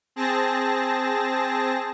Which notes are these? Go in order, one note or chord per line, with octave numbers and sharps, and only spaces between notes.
C4 G#4 A5 A#6